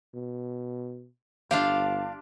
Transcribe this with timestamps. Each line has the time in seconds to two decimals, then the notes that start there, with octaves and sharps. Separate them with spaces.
0.14 B2
1.51 G1 D4 F4 G4 F5